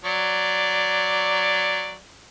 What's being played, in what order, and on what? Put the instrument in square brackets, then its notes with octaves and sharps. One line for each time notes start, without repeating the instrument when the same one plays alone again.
[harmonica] F#3 D5